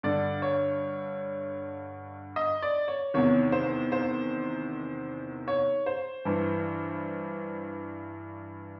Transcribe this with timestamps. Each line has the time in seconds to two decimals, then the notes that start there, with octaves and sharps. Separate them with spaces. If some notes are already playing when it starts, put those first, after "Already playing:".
0.03 G2 D3 D5
0.42 C#5
2.36 D#5
2.62 D5
2.88 C#5
3.14 E2 C3 D#3 C#5
3.52 C5
3.92 C5
5.48 C#5
5.86 C5
6.25 G2 E3